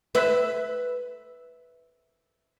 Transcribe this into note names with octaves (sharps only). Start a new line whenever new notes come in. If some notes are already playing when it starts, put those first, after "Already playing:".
B4 E5